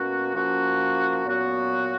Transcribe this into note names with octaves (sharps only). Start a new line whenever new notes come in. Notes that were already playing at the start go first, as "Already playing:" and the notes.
Already playing: B2 A#3 C#4 F#4
F3 A#3 C#4 F#4
A#2 F#3 B3 F#4